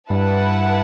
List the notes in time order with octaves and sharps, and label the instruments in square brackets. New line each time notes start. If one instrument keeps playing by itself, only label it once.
[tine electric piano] G2 G3 [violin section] E4 B4 F#5 A5